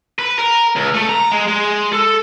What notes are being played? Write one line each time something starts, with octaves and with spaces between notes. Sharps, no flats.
B4
A#4
C#2
A3
A#5
G#3
G#3
A4